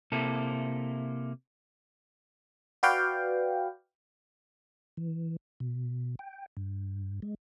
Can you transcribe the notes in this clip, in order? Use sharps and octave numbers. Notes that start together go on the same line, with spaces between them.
C3 A#3 E4 A4
F#4 B4 D5 F5 G5
E3
B2
G5
G2
G#3